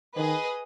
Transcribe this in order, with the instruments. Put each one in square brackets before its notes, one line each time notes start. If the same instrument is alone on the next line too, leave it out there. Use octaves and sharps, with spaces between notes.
[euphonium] D#3 [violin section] G#4 B4 D#5